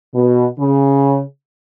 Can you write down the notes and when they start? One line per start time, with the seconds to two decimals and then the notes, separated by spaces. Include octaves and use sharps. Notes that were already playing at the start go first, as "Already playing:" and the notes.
0.14 B2
0.60 C#3